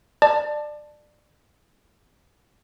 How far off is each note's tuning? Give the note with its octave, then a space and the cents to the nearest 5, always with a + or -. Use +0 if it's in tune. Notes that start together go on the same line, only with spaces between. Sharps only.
D5 +25 A5 +0